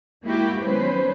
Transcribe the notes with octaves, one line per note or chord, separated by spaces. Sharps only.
G#3 A#3 E4 F#4 G4
D#3 F#3 B3 C#4 B4 C5